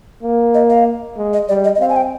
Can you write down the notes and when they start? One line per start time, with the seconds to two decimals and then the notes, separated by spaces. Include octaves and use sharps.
0.23 A#3
0.54 D#5
0.70 F5
1.17 G#3
1.33 D#5
1.49 G3 D5
1.64 D#5
1.75 D#5
1.80 C4 F5
1.89 G#5
1.96 G5